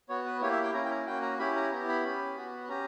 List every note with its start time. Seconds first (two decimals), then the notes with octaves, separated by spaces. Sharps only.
0.09 B3 F#4 C#5
0.26 B4
0.41 A#3 E4 G4 C#5
0.52 E5
0.63 G5
0.74 A#3 C#4 E4 A#5
0.85 G5
0.91 A#5
1.06 A#3 C#4 F#4 G5
1.22 A#5
1.39 C#4 E4 G4 B5
1.56 A#5
1.72 B3 E4 G4 A#5
1.88 B5
2.03 C#4 G4
2.36 B3 F#4
2.68 C#4 G4 A#5